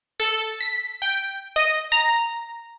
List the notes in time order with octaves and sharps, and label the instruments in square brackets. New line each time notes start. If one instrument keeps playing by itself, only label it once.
[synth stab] A4
B6
G5
D#5
A#5